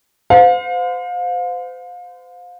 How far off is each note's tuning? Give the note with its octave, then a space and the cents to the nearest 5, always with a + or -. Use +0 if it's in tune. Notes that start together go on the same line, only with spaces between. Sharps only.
C5 -35 F5 +35